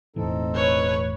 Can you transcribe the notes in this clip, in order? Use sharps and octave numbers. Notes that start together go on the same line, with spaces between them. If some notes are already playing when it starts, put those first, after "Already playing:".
E1 A2 E3 C4 D#4 A4
B4 C#5